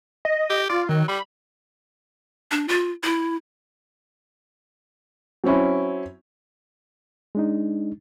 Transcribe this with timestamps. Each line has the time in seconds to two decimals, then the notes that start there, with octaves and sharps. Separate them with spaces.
0.25 D#5
0.50 G4
0.70 F4 D5
0.89 D#3 F#3
1.08 G3 B5
2.51 D4
2.68 F4
3.03 E4
5.44 F#3 C4 C#4 E4
7.35 G#3 D4 D#4